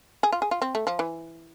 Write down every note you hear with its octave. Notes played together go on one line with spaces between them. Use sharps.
G#4
F4
G#4
F4
C4
A3
F3
E3